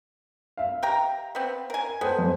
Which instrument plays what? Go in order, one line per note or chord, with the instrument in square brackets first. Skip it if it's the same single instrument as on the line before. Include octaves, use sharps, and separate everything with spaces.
[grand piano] E5 F5
[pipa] G4 G5 A#5
B3 C4
A#4 G#5
[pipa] B3 [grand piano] A4 C5 G5
[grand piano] F2